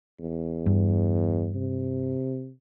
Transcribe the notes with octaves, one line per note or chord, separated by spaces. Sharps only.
E2
G2
C3